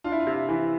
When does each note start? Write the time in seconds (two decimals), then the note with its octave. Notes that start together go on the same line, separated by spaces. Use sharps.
0.04 D4 F4
0.12 E4
0.20 F4
0.27 C3
0.34 F4
0.49 E3
0.64 E4